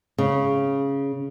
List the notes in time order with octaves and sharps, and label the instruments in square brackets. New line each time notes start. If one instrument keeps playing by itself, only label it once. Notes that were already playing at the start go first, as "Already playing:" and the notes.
[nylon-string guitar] C#3